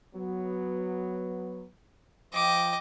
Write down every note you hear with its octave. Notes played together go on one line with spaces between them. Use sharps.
F#3 B3
F3 D#5 G5 D6